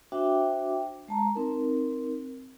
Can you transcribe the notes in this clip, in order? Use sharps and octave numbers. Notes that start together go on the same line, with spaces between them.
D4 F#4 C5 E5 G5 D6
G#3 A5 A#5
C4 D#4 A#4